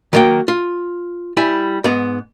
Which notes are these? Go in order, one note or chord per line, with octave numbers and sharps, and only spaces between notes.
D#3 F#3 A#3 F#5 G5
F4
G3 E4 G#5
G#2 B3